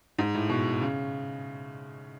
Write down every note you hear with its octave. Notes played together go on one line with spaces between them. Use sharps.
G#2
A2
B2
C#3